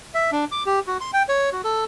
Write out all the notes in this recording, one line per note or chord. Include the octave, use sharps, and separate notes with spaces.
E5
D4
D6
G4
F#4
C6
G5
C#5
F#4
A4